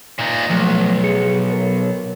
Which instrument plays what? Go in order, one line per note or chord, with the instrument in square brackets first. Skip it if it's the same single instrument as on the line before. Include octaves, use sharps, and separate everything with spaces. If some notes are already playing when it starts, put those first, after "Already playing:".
[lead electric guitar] A#2 D#4
[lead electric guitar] B1 [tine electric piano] F3 F#3 A3
[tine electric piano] G#4 C#7
A#4 C#5